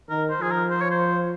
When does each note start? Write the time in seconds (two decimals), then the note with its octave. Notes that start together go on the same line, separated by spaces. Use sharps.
0.10 D#3 A#4
0.30 C5
0.40 F3 G#4
0.51 A#4
0.70 C5
0.81 C#5
0.91 C5